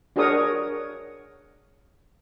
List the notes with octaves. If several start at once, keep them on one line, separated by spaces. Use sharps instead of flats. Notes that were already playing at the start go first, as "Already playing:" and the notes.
D4 F#4 G#4 A#4 C#5 D#6